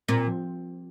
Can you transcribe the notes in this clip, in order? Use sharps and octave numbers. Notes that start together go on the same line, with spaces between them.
A#2 C4
F3